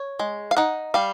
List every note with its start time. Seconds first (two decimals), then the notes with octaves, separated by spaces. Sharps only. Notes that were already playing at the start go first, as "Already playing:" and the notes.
Already playing: C#5
0.19 G#3
0.51 F5
0.57 D#4 F#5
0.94 G3 F5